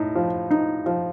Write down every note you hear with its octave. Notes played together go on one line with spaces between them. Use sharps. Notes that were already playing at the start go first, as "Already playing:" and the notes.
Already playing: A2 D#4
F3
D#4
F3